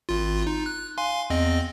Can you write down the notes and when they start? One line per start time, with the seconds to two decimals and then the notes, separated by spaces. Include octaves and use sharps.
0.09 G#1 F4
0.47 D#4
0.66 F#6
0.98 F5 G#5 C6
1.30 E2 C4 D#5